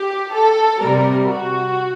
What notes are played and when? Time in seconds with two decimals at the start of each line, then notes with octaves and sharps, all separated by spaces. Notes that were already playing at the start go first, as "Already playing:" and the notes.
Already playing: G4
0.35 A4
0.81 C3 G3 A#4
1.29 F#4